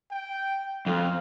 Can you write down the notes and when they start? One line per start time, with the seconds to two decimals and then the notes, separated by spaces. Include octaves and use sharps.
0.11 G5
0.86 F2 F5